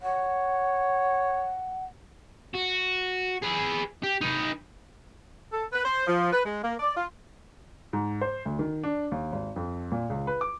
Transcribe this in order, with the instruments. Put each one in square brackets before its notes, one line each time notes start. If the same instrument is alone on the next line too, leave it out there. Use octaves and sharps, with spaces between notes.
[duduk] C#5 [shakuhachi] F#5
[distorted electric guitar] F#4
G#4 B4
G4
D#4 B4
[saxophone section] A4
B4
C5
F3
B4
G#3
A#3
D5
F4
[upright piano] G#2
C5
D2
D#3
D4
D#2
G#1
F2
A#2
C#2
B4
D6